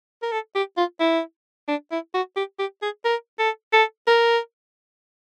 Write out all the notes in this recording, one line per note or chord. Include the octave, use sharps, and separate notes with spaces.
A#4
A4
G4
F4
E4
D4
E4
F#4
G4
G4
G#4
A#4
A4
A4
A#4